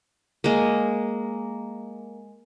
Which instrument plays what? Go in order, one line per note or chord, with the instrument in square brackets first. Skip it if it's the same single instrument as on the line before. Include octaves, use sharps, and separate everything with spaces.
[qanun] G#3 A#3